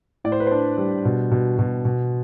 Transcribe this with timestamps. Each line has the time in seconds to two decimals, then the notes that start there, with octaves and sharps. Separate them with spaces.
0.24 A2 D5
0.32 C5
0.40 B4
0.47 D4 C5
0.78 G3
1.05 B2
1.31 B2
1.59 B2
1.85 B2